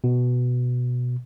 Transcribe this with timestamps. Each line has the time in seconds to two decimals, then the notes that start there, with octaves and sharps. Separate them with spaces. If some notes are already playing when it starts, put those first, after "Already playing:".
0.04 B2